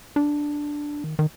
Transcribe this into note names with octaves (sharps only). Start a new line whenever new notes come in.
D4
D#3
D#3